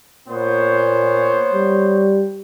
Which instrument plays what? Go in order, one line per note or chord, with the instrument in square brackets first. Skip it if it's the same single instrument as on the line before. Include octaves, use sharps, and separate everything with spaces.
[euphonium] A#2 [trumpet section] B3 C5 C#5
[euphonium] G3